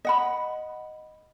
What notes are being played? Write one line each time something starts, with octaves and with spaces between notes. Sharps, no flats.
D#5 F#5 B5